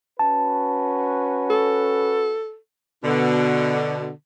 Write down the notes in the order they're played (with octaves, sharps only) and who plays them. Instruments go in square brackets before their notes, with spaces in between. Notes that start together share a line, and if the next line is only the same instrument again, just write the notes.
[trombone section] C#4 F#4 B4 [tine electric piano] A5
[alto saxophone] A4
[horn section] B2 D3